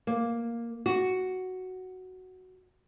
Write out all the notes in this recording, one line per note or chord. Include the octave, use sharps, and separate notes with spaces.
A#3
F#4